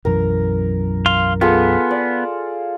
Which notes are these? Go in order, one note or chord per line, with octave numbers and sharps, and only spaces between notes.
B1 F#2 E3 A#4
F5 C6
B3 F4 G#4 A4
D5